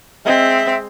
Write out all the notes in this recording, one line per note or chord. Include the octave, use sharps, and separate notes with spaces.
G#3 C4 G#4 E5